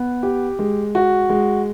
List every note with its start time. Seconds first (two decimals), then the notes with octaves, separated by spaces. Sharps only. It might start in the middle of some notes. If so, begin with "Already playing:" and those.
Already playing: B3
0.23 G4
0.59 G#3
0.95 F#4
1.30 G#3